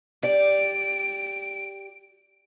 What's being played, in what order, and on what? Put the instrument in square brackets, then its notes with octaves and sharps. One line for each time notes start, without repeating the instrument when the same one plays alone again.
[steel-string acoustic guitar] G4 D5 [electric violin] D7